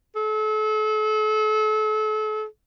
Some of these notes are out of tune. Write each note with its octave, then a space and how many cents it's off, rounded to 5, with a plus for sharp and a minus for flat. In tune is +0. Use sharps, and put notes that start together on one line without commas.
A4 -35